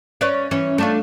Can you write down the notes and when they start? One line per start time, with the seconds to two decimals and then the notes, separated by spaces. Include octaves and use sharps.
0.21 C#4 B4 D5
0.51 E3 C#4
0.78 A3 D4 F4